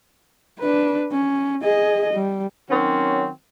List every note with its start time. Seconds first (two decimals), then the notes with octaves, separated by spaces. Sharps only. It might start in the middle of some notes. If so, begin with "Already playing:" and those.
0.59 D4 B4
1.12 C#4
1.63 G#4 D#5
2.13 G3
2.70 D#3 F#3 C4 C#4 F#4